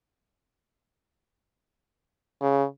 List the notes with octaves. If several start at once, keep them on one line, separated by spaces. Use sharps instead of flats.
C#3